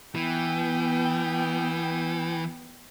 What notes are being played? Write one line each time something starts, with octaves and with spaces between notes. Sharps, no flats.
E3 B3 G5